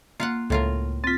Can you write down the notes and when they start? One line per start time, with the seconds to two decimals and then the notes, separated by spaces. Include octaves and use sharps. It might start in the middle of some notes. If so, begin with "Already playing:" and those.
0.20 A#3 F4 F5 F#5
0.50 C#2 A2 F4 A#4
1.04 C4 F4 A6 B6